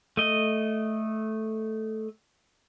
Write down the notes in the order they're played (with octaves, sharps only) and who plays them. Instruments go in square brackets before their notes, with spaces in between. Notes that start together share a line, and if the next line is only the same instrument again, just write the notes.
[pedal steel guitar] A3 D#5